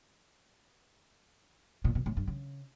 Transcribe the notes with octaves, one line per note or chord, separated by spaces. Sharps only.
A#2
B2
A2
G2
C#3